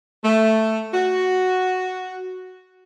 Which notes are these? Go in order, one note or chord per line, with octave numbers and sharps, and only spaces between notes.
A3
F#4